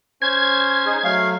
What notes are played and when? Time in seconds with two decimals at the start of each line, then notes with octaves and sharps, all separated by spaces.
0.22 C#4 C5 G#6
0.86 D#4 G#4
1.04 F#3 A3 F5